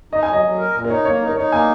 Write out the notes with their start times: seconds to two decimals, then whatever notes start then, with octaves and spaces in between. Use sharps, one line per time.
0.13 D#4 D#5
0.23 G#5
0.28 F#3
0.33 D#5
0.44 F#3
0.58 A#4
0.74 A#2
0.84 A#4
0.90 D#4 C#5
1.05 A#3 C#5
1.21 D#4
1.28 A#4
1.36 D#4 C#5
1.52 A#3 G#5